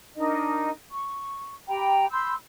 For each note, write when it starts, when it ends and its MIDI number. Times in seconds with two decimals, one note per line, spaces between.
0.16 0.70 62
0.16 0.70 63
0.16 0.70 70
0.16 0.70 75
0.91 1.52 85
1.68 2.05 67
1.68 2.05 79
1.68 2.05 82
1.68 2.05 83
2.11 2.33 83
2.11 2.33 84
2.11 2.33 88
2.11 2.33 91